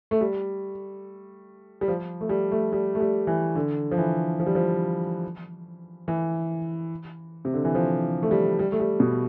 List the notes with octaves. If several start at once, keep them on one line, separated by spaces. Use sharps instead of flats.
A3
G3
G3
F3
A3
G3
A3
G3
A3
G3
E3
D3
F3
E3
F3
G3
F3
E3
C3
D3
E3
F3
A3
G3
G3
A3
G3
B2